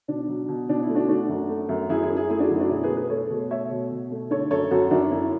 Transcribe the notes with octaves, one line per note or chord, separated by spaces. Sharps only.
B2 D4
F#3
B2
B2 D4
E4
A3
D4 F#4
A3 D4 F#4
F#2
A3
F#2
F#2 E4 G#4
E4 G#4
F#2
E4 G#4
A3 E4 G#4
D4 F#4
F#2 E4
D4 F#4
B2 E4 G#4
G#4 B4
A3
G#4 B4
A3 A4 C#5
B2
A3 C#5 E5
B2
B2
A3
D3 A4 C#5
F#2 A4 C#5
F#2 F#4 A4
F#2 D4 F#4
F#2 E4